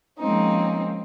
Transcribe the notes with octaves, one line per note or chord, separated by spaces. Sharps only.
F3 G#3 A#3 C4 C#4 D#4